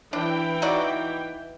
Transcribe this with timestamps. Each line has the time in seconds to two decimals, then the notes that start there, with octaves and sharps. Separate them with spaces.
0.13 E3 D4 G5
0.62 D#4 F#4 D5